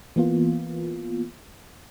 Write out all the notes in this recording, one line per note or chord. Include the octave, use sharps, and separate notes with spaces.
E3 A#3 B3 F4